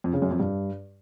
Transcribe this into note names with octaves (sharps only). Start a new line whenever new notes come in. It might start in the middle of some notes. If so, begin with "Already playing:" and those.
F2
C#3
F#2
F2
G2